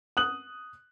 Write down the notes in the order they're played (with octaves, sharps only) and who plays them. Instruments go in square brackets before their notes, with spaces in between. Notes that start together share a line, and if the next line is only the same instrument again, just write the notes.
[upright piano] D#6 F#6 F#7